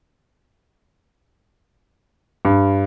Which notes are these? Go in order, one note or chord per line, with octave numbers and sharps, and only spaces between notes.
G2